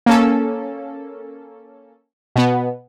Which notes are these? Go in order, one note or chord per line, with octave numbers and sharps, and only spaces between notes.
A#3 C#4 A4
B2 B3